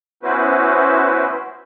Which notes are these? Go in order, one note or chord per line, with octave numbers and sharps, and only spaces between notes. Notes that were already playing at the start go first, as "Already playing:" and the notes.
B3 C#4 E4 F#4 B4 C5